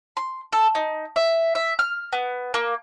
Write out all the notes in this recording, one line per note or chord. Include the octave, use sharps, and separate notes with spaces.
C6
A4
D#4
E5
E5
F6
B3
A#3